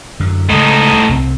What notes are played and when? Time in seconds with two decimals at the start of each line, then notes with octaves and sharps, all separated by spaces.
0.20 F#2 D3
0.50 C#2 A2 D#4
1.09 C2 C4